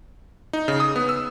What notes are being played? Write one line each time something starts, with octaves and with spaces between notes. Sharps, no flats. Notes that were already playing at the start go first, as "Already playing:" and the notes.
D#4
C#3
D#6
B3
E6